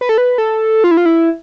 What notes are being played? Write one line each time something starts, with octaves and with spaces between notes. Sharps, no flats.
B4
A4
B4
A4
F4
E4
F4
E4